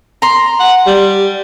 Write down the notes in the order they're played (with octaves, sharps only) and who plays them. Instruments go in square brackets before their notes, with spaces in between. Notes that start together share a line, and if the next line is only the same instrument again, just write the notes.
[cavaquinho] A#5 C6
[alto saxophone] F#5
G3